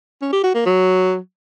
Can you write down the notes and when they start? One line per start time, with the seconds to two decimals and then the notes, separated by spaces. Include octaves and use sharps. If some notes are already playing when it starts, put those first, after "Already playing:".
0.22 C#4
0.33 G4
0.44 F#4
0.55 A#3
0.66 F#3